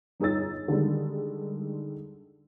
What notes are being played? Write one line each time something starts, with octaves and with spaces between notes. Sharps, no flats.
G1 D#4 G#4 C#5 E6 A6
D3 D#3 G3 G#3